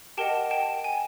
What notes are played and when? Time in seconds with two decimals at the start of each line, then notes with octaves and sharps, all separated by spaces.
0.17 G4 A#4 D#5 F#5 G5 A5
0.51 G5 A5
0.84 G#5